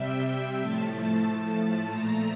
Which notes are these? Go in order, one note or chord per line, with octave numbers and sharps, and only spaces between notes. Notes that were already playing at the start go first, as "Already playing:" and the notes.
Already playing: C3 G3 E5 G5
A2 F3 A3 A5
A5
A#2 F3 A3 A#5